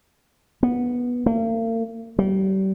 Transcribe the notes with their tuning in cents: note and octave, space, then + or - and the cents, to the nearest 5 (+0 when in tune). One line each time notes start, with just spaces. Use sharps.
B3 -15
A#3 -45
G3 -35